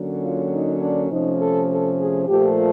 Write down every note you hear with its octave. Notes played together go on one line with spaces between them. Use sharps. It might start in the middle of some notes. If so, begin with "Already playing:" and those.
Already playing: D3 F#3 A#3 C#4
F4
D#4
D4
C3 F3 A3 C#4 D#4
A4
A4
G#4
A#2 F3 A3 G4